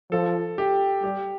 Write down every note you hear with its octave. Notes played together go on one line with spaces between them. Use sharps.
F3 A4
G4
G3 G4